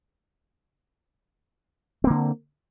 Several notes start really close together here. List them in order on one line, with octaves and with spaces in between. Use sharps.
C4 A#3 D3